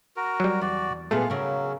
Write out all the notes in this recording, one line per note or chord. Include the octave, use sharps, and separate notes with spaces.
F#4 A#4
F#3 G3
E2 F#4 D5
A#2 A3 B3 F4 G#4 F5
C#3 F#3 C#4 A#4